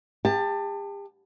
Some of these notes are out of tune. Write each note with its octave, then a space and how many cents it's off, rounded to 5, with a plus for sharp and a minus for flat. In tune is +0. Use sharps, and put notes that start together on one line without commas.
G4 +40 A5 +20